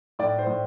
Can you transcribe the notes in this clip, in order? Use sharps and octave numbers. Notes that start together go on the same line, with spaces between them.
A2 D5
C5
A2